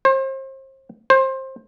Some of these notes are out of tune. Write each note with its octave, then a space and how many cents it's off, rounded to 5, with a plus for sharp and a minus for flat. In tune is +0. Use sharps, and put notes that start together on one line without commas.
C5 +35
C5 +20